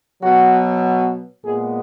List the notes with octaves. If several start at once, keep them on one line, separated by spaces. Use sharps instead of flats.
B2 F#3 B3 F#4
A#2 G#3 B3 G#4